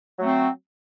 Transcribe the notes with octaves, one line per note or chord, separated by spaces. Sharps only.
F#3 A3 C4